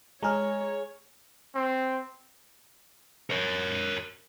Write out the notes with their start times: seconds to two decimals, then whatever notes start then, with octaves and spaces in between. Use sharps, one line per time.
0.23 G#3 G#4 C#5 A#5 F6
1.55 C4
3.30 A#4 C#5